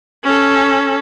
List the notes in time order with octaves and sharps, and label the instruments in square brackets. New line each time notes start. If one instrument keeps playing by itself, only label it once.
[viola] C#4 A4